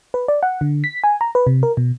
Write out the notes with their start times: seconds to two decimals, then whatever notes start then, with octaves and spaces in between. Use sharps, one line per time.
0.14 B4
0.28 D5
0.43 F#5
0.61 D3
0.84 B6
1.04 G#5
1.21 A#5
1.35 B4
1.47 C3
1.63 A#4
1.77 B2